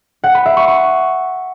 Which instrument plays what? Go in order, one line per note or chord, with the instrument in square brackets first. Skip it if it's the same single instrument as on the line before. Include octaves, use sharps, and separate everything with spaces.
[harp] F#5
B5
E5
C#6
C#6